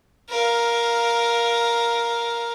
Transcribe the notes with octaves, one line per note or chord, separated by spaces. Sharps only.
A#4 F5